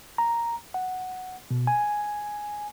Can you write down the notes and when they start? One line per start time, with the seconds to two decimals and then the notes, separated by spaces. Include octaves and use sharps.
0.18 A#5
0.74 F#5
1.51 B2
1.67 G#5